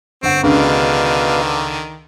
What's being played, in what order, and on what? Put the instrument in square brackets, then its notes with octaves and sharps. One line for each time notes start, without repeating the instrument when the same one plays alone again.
[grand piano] G1 F#5 [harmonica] C4 [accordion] C#6
[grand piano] C#2 [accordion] B2 B4 F5 [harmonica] D3 D#3 [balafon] C#4 D4